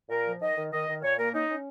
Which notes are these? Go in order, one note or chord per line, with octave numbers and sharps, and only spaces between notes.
A#2 A#4
F3
D#3 D#5
D#3
D#3 D#5
D#3
A#2 C#5
A#3 A#4
C#4 D#4
C#4